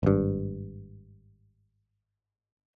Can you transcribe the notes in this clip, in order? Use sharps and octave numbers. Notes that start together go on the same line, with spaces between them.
G#1 G2